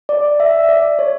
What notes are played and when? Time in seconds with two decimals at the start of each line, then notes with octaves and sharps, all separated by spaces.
0.09 D5
0.40 E5
0.69 D5
0.99 C#5